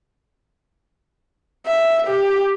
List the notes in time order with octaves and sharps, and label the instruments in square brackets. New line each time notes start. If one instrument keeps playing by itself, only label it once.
[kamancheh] E5
G4